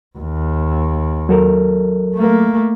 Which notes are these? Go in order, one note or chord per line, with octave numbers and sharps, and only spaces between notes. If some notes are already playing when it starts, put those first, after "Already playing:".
D#2
F#3 A4 A#4
A3 A#3